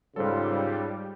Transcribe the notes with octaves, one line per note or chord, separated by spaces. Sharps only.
G#2 C#3 G3 F4 A4 C5